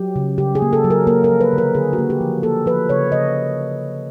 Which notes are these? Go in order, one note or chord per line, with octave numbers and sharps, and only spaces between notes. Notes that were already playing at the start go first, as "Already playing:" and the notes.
Already playing: F#3 G4
C#3
C#3 G4
G#4
A#3
A4
F#3
A#4
A#3 A#4
A#4
F3
B4
D3 A#4
D3 G#4
F#4
A#3
G4
F3
A#3 A4
F3 B4
C#3 C#5
C#3 D#5